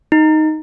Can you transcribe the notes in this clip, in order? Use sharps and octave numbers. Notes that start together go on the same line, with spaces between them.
D#4